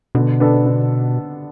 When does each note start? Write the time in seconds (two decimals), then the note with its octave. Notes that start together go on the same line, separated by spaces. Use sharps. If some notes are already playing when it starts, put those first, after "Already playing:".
0.15 B2 D3
0.40 B3 D4 A4
0.66 D3